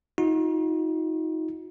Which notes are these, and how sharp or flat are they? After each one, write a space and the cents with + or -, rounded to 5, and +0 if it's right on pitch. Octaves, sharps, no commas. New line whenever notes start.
D#4 +30 F#4 -45